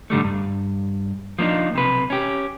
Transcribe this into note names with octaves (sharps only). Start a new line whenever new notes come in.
G#2 D3 G3 A3
G2
F3 A#3 D4 D#4
B1 C3 B4
C#4 G4